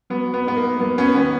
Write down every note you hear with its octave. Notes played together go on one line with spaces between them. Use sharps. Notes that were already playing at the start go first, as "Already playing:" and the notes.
F#3 B3
B3
G#2 B3
A#3
F#3 B3
B3 C#4
D#3 B3 C#4